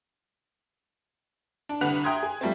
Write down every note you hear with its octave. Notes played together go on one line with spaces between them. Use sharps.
D4
C2 D3 B4 F#5 F#6 F7
E5 G5 A#5 C6 D#6 G#6
G#4
F3 G3 A3 C4